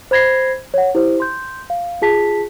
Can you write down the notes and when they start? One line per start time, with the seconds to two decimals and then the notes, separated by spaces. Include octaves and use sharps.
0.11 C5 B5 G#6 A#6 C7
0.74 C#5 F#5
0.95 E4 G4 C5
1.20 C6 G6
1.70 F5
2.02 F4 G#4 A5 B6